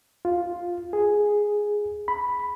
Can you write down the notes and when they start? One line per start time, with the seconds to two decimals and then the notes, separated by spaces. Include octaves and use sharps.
0.25 F4
0.93 G#4
2.08 B5